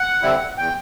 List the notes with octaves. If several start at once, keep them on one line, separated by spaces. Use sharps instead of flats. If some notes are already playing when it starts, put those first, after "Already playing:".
Already playing: F#5
D3 G3 C4 E4
E2 G5